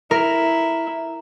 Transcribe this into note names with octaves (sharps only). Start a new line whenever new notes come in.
E4 A#4